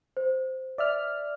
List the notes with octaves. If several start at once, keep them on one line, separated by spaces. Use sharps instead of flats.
C5
D5 E5 F6